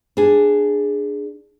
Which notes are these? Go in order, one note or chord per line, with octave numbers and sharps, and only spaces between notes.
D4 G#4